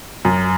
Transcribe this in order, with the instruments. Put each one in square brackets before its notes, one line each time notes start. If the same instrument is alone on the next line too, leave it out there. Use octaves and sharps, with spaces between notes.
[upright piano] F#2